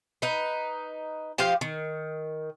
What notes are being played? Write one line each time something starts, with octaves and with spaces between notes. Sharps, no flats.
D#4 B4
F3 G4 C5 F5
D#3